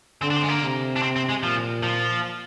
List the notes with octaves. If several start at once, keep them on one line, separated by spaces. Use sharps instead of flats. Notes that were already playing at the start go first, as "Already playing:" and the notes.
D3 C4
D4
C4
G#3
A#3
C3
D4
C4
C4
G#3
A#2 F3
F3